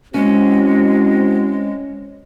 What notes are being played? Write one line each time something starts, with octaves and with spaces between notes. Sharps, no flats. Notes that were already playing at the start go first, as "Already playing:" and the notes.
G#3 C4 C#4 E4 F#4